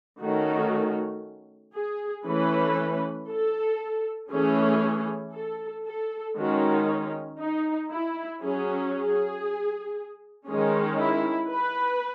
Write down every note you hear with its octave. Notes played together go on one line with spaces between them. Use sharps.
D#3 A3 C#4 F#4
G#4
E3 A3 C#4 B4
A4
E3 A3 C#4 G#4
A4
A4
D#3 G#3 C#4 F#4
D#4
E4
F#3 C#4 G#4
G#4
D#3 G#3 C#4 G#4
E4
B4